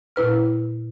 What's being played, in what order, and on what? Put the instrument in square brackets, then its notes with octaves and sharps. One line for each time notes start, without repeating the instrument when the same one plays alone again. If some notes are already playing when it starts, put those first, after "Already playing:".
[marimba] A#2 E4 B4 F6